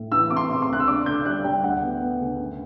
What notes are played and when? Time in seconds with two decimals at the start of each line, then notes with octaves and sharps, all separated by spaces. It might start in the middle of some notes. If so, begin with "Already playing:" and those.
Already playing: A2
0.12 E3 E6
0.30 C3 D6
0.37 C6
0.50 C3
0.62 C6
0.68 D2 F#6
0.80 E6
0.88 D4 D6
1.06 D3 G6
1.25 G3 F#6
1.44 G3 G5
1.63 D2 F#5
1.82 B3
2.01 B3
2.20 D2
2.39 F#2